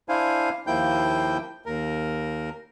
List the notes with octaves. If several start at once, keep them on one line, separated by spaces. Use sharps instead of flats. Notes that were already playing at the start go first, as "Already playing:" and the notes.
D4 E4 C5 F5 G#5
D#2 F3 A#3 E4 G5 G6
D#2 A#4